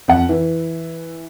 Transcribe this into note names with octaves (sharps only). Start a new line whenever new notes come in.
F2 F#5
E3